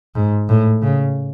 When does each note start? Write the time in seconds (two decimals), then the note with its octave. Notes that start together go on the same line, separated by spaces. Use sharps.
0.15 G#2
0.49 A2
0.82 C#3